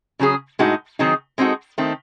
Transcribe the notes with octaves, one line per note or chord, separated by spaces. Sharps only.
C#3 F#3 C#4 G#4
A2 G#3 D#4 F#4
D#3 F#3 C4 D#4 G#4
G#3 C4 D#4 F#4 A4
D#3 A3 C4